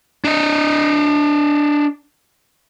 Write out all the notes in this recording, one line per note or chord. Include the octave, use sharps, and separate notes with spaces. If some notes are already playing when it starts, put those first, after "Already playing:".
D4 D#5